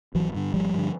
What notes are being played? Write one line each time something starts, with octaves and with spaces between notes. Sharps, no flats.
G#1 E3 F#3
G2 D3
G#1 F3 G3
G2 D3